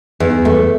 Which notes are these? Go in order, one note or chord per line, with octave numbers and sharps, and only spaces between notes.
E2
A3